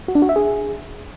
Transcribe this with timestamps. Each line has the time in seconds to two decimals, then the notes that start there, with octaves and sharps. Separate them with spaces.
0.08 F#4
0.15 D4
0.22 F#4
0.29 E5
0.36 G#4